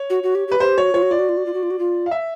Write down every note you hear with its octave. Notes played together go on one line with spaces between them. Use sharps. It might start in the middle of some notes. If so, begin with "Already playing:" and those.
Already playing: C#5
F#4
F#4
G4
G4
B4
G4 C5
F#4 C#5
F4 C#5
F#4
F4 D5
F#4
F4
F#4
F4
F#4
F4
F#4
F4
F5
E5